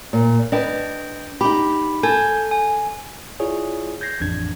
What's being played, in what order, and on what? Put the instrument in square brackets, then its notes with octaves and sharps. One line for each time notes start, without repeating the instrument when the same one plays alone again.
[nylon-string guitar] A#2
[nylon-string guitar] D4 B4 [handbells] D#5 G5
[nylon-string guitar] D#4 G4 [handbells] B5
[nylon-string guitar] A4 [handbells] G#5 G6 G#6
[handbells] G#5
[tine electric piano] E4 F4 G#4 C#5 D5
G6 G#6 A#6 C7
A1 F2 D4 G#6